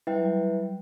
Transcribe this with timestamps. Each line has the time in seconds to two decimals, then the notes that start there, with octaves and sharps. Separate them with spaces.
0.07 G3 E4 B4 E5 G5
0.15 F#3
0.25 G3